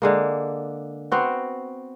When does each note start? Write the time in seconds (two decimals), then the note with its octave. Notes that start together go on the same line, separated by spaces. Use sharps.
0.02 D3 G#3 A#3
1.12 B3 C4 F#4